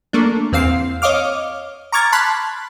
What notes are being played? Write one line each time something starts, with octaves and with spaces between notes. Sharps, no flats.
A3 A#3 D4
E2 C4 F5 C7
C#5 D#5 F5 D6 F6
A#5 C#6 D6 F6 G#6 A6
A5 B5 C6 F6 F#6 B6